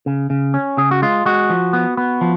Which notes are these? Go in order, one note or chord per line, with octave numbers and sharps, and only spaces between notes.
C#3
C#3
C#4
C#3 G#4
F#4
G#3 F4
G#3 F#4
F3
B3
B3
F3